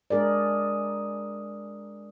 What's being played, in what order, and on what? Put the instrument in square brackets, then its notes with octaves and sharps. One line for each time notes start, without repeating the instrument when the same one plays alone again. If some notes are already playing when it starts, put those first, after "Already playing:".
[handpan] G#3 D4 G#4 A#4 D5